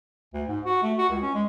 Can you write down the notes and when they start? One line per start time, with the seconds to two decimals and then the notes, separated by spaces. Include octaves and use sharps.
0.33 D2
0.48 G#2
0.65 F#4
0.83 A3
0.98 F#4
1.10 C#2
1.22 C#4
1.34 G#3